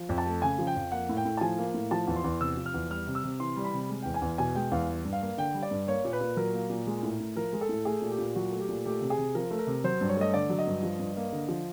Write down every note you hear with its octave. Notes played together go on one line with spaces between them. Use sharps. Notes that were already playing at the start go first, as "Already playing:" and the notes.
Already playing: F3
F2
A5
A3
C#3 G#5
F3
G5
F2
A#3 F#5
A2
G5
A2
A5
F3 G#5
A#3
A2
F3 A5
E2
C6
E2
C3 E6
F3
F6
E2
G3 F6
C3
E6
C3
E3 C6
G3
B5
C3
G#3
E2 G5
G#5
E2
B2 G#5
G#3 G5
E2 F5
G3
G2
F5
A#3
D3 G5
G3
D5
G2
A#3 C#5
A#2
B4
A#2
F#3 A#4
A#3
A#2
G#3
A2
A2
F3 A#4
G#3
A4
A2
A3 G#4
A#2
G4
A#2
F#3 F#4
A3
G4
A#2
A3 G4
C3
G#4
C3
F3 A#4
A3
A#4
C3
F#3 C5
G2
C#5
A3 D#5
D3 D5
F#3
D#5
G2
F3
G2
A#3
D3
F3